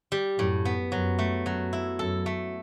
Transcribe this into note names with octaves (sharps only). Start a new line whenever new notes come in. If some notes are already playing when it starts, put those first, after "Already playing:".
G3
F#2 A2
B3
F#2 F#3
A3
F#2 F#3
E4
F#2 A4
A3